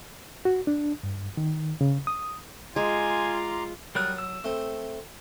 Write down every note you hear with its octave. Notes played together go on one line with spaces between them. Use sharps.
F#4
D4
G2
D#3
C#3
D#6
G#3 F4 G#5 A#5 C6 D6
F#3 G3 A#4 D#6 F#6
E6
A3 C4